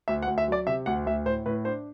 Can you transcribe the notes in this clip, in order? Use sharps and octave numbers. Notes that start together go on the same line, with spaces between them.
D2 E5
F#5
D2
E5
F#3 D5
C3 E5
D2 F#5
D2 E5
A2 C5
A2 B4
D4 C5